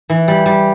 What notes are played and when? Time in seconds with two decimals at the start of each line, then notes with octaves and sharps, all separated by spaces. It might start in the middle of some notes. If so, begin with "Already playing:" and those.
0.10 E3
0.28 G3
0.46 G3